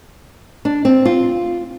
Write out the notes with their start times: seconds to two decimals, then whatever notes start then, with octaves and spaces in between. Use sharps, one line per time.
0.65 D4
0.85 C4
1.05 F4